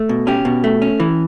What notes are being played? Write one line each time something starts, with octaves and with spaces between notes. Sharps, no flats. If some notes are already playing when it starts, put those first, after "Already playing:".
Already playing: A3
B2
C#4 G4
B2
A3
C#4
E3